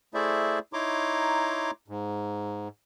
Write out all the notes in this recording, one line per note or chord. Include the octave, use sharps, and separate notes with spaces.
A3 E4 G#4 C5 D5 E5
D#4 E4 C#5 A#5 C6 D6
G#2